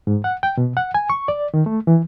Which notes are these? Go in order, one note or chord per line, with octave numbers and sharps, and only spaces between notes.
G#2
F#5
G5
B2
F#5
G#5
C#6
D5
D#3
A3
E3